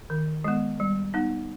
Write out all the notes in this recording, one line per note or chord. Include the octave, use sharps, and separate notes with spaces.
D#3
G#3 B3
G3
B3 D#4